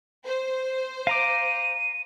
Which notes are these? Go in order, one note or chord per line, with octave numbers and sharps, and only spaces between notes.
C5
F5 A#5 D6 D#7